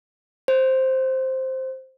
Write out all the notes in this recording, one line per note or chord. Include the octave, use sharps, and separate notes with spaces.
C5